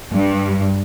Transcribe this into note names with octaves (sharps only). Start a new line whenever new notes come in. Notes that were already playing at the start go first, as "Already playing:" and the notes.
G2